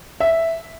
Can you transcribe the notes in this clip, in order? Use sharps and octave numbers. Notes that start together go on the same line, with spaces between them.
E5